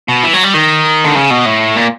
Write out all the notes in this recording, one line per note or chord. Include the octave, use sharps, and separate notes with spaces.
B2
E3
F#3
G3
D#3
D3
C#3
B2
A2
A#2